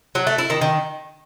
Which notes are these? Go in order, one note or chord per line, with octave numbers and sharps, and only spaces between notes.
F#3
A3
E4
D#3
D#3